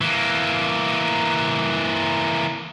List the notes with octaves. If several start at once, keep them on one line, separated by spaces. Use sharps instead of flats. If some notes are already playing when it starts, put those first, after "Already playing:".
E3 A#3